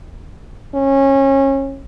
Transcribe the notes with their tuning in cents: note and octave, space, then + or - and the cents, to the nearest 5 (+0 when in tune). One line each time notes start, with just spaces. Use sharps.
C#4 -25